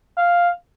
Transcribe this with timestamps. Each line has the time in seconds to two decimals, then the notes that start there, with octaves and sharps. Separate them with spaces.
0.17 F5